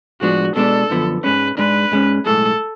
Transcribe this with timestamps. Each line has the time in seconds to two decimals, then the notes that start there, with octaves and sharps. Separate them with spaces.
0.22 A2 F3 G#3 B3 D4 F#4
0.56 B2 G#3 B3 D4 A4
0.90 F#2 D3 F3 B3
1.24 G#2 G#3 C#4 B4
1.58 G#2 G#3 D4 B4
1.92 G#2 G#3 C#4
2.26 B1 A2 G#3 A4